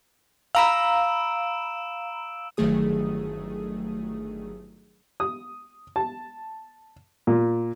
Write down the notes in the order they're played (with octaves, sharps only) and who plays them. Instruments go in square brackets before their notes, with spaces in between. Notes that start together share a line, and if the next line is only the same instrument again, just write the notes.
[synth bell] F5 A#5 B5 [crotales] E6 D7 E7
[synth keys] G1 D#3 F#3 A3 G#4 D#6
[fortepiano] D#6
A5
A#2